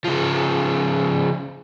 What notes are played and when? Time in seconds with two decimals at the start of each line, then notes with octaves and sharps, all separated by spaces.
0.04 C#3 F3